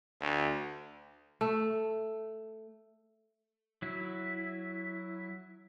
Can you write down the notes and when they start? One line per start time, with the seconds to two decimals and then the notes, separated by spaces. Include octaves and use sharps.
0.20 D2
1.41 A3
3.82 F#3 E4